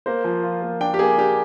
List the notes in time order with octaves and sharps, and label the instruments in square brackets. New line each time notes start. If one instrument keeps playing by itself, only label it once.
[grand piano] A#3 C5
F3
F4
A#3
D4 G5
G4
A#3 G#4
D4 G4